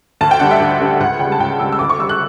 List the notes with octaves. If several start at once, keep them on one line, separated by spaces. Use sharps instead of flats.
D2 A5
G5
D3 G3 F#5
E5
D2
D3 G3
C#2 F#5
C#3 G5
G3
A5
C#2 G5
C#3 G3 E6
E6
D2 D6
C#6
C#3 G3 E6
F#6